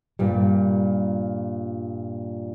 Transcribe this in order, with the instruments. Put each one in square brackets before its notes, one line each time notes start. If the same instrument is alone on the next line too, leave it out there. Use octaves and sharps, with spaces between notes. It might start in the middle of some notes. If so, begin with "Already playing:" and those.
[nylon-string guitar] G2 A#2 G3